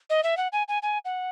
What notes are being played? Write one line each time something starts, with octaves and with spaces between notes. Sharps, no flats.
D#5
E5
F#5
G#5
G#5
G#5
F#5